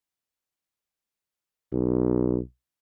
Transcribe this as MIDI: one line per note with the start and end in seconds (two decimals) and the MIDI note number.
1.73 2.38 35